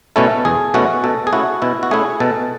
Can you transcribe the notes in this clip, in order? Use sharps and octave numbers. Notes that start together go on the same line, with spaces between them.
B2 A3 C#4 E4 A4
E2 G#4
B2 A3 C#4 E4 F#4
B2 A4
G#4
A3 C#4 E4 F#4
B2 E4
F#4
A3 C#4 E4 G#4
B2 A4